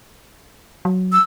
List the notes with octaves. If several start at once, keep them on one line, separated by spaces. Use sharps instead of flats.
F#3
E6